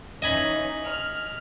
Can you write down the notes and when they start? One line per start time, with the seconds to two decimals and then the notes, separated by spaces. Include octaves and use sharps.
0.22 E3 C#4 D#4 D#5 G#5 B5
0.86 F6